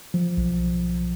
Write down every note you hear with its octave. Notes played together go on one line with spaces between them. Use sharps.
F3
B1